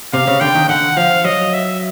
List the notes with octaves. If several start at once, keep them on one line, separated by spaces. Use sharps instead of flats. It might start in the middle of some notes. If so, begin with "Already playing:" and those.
C3 F5
C#3
D3 G5
D#3
D3 F#5
F3 F5
F#3 D#5
E5